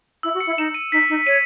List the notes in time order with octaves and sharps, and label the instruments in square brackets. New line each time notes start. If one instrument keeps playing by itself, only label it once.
[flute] E4 [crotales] E6
[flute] F#4
[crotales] C#7
[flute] E4
[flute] D#4 [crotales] E7
[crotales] D#7
[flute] D#4 [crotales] B6
[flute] D#4
[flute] C#5 [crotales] D#7